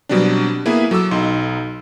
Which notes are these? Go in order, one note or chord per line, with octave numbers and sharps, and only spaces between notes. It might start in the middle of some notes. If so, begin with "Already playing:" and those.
B2 F#3 G3 C4 D4
A#3 B3 E4 G#4 B4
F#3 A4 D6 E6
B1 D#4 C6